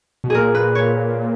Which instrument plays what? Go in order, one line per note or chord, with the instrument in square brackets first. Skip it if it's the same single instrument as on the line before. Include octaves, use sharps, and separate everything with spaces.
[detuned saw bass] B2
[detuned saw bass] A#2 [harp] G#4 A#4
[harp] B4
C#5